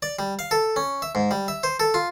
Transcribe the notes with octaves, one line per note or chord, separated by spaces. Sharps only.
D5
G3
F5
A4
C#4
E5
G#2
G3
E5
C5
A4
F4